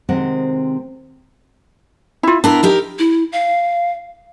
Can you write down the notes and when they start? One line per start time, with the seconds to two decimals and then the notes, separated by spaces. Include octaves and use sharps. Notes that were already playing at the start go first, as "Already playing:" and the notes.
0.09 C3 D#3 G#3 C4 C5 F#5
2.23 E4 F4
2.44 B3 D4 E4 A#4
2.63 D#4 G4 A#4
2.99 E4
3.32 F5